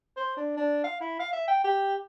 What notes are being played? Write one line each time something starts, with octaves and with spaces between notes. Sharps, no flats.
C5
D4
D4
F5
E4
F5
E5
G5
G4